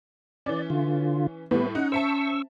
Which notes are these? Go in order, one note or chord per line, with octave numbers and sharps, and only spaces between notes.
E3 C#4 D5
D3 F4
A2 G3 B3 B4
C#4 D#4 F#5
C5 E5 A5 C#6 E6